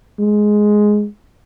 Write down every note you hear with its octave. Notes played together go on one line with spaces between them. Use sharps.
G#3